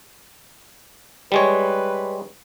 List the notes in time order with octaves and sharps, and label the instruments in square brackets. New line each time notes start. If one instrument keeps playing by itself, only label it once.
[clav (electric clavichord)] G3 G#3 C#5 [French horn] B4